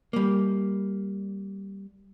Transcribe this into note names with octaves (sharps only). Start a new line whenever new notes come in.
G3 A#3